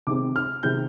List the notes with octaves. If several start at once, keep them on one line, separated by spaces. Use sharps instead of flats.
C3 D#3 G#3 C4 D6
F6
C3 D#3 G#3 C4 G6